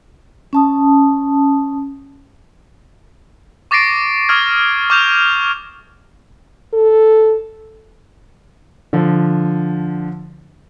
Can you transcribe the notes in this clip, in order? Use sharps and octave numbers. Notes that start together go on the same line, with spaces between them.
C#4 A5 D#6
C#6 D6 A6 A#6 C7 D7
C#6 D#6 F6 G#6
C#6 D6 F6 G6 E7 F7
A4
D3 F3